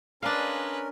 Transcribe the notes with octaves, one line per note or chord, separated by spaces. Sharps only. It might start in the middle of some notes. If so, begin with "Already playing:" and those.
G#3 C#4 D4 A#4 B4 F5